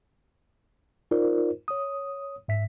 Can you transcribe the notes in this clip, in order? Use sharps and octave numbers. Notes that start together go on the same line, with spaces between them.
D#4 F4 A#4 C5 D5
C#5 D#6
G#2 E5 B6